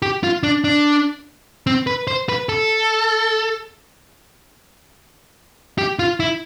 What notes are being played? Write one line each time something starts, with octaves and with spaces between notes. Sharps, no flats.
G4
F4
D4
D4
C4
B4
C5
B4
A4
G4
F4
E4